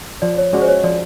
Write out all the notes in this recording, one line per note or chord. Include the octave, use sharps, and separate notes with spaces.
F3 D5
C#5
G#3 C#4 F#4 D5
C5
C#5
F3 D5